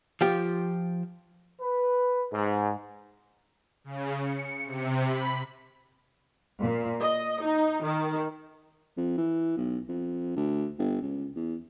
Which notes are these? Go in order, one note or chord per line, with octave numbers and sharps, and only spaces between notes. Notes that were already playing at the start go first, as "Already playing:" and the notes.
F3 F4 G4
B4
G#2
C#3
C#7
C3
B5
A#2
D#5
D#4
D#3
F2
E3
B1
F2
D2
G1
C#2
E2